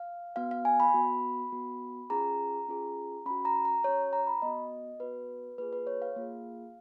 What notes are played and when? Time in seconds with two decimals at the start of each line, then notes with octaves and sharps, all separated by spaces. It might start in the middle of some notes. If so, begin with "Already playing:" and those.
Already playing: F5
0.36 B3 F#4 F5
0.51 F5
0.65 G#5
0.80 B5
0.94 B3 F#4
1.52 B3 F#4
2.10 C#4 F4 G#4 A#5
2.68 C#4 F4 G#4
3.26 C#4 F#4 B5
3.45 A#5
3.65 A#5
3.84 C#4 F#4 C#5
4.13 A#5
4.27 B5
4.42 B3 F#4 D#5
5.00 B3 F#4 B4
5.58 A#3 F4 G#4 B4
5.73 B4
5.87 C#5
6.02 F5
6.16 A#3 F4 G#4